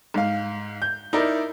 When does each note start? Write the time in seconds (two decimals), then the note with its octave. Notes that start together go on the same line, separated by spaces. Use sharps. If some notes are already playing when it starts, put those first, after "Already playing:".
0.14 G#2 F5
0.82 G6
1.13 D#4 E4 A#4 D5